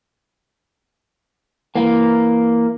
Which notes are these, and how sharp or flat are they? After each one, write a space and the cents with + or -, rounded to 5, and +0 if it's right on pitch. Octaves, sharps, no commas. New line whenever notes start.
E3 +0 A#3 +0